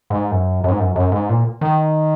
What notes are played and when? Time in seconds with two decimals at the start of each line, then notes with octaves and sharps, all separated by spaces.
0.10 G#2
0.31 F#2
0.64 F#2
0.71 G#2
0.80 F#2
0.96 F#2
1.12 G#2
1.29 A#2
1.61 D#3